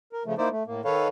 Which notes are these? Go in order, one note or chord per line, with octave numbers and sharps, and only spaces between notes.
A#4
C#3 F3 A3
A#3 D#4 E4 C5 D5
A3
A2 A#3
D#3 A4 B4 C#5 F5